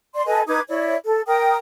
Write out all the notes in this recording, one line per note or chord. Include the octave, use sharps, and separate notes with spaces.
D5 C6
A4 B4 D#5 G#5
D#4 B4 D6 G#6
E4 C#5 D5
A4
A#4 G5 D#6